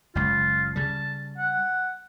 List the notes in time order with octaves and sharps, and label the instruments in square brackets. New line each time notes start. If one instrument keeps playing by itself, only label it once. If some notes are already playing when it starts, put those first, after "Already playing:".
[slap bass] F#1 C#2 [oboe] F4
[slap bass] C#3 G3 [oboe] A5
[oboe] F#5